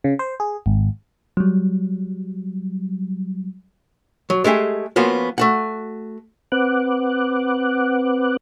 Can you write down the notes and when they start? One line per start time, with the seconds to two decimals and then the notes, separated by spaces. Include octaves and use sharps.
0.04 C#3
0.19 C5
0.40 G#4
0.66 G#1
1.37 F#3 G3
4.30 F#3
4.44 G#3 A3 G4 G#4
4.96 F3 A#3 B3 C#4 F4 F#4
5.38 A3 F#4 F#5
6.52 C4 B4 F#5 D6 F#6